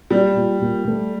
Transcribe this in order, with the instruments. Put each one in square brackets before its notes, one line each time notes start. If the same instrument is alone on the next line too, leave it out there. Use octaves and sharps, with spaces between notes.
[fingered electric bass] A#2 [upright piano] G3
[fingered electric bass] A#2
A#2
A3